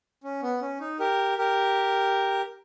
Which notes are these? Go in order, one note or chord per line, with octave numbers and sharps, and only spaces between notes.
C#4
B3
C#4
D#4
G4 A#4
G4 A#4